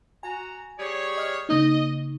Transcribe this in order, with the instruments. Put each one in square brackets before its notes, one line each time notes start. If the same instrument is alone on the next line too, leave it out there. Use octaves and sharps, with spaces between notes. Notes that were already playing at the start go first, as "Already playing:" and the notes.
[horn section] F#4 A#5 [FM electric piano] G#5
[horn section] G3 G#4 C#5
[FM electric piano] D#5 D#6 F6
[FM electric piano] C#3 A#3 D#4 [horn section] D#5